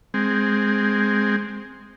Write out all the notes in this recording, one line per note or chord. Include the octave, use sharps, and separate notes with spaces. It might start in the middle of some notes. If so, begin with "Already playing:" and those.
G#3 C4